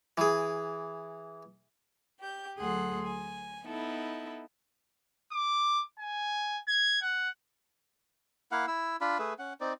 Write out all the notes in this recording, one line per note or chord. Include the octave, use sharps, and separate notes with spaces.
E3 G#4
G4 G6
D2 F#3 G#4 A4 F#5 C6
G#5
B3 D#4 E4 A4
D6
G#5
G#6
F#5
A#3 E4 F5 F#5
E4 E6
D4 F4 B5
A3 G#4 B4 E5
C#4 F#5
C4 D#4 D5